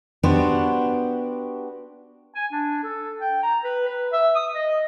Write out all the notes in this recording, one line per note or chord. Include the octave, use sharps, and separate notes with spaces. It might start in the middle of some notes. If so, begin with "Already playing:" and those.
B3 D4 F#4 G4 C5
G#5
D4
A4
G5
A#5
B4
B4
E5
D#6
D#5